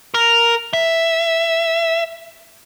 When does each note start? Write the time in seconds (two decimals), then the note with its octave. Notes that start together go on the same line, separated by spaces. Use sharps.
0.14 A#4
0.73 E5